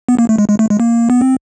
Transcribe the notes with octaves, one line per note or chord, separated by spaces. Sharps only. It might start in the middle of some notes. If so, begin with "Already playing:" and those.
B3
A#3
A3
G#3
G#3
A3
G#3
A#3
B3
C4